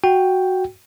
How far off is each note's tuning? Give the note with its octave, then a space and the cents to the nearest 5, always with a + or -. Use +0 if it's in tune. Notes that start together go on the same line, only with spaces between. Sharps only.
F#4 +0 G5 +0